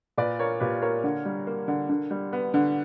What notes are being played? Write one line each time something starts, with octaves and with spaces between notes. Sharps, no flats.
A#2 B4 D5
A#3 A#4 C#5
A#2 G4 B4
A#3 A#4 C#5
D3
G3
A#3
D3
D3
G3
B3
D3